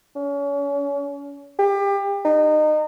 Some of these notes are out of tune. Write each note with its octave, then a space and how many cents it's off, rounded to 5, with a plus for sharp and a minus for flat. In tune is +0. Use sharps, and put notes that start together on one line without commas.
C#4 +35
G4 +30
D#4 -25